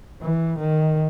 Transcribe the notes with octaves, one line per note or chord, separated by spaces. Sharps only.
E3
D#3